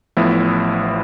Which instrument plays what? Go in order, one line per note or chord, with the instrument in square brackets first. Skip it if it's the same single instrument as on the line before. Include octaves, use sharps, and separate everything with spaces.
[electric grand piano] A1 A2 F3 B3 E4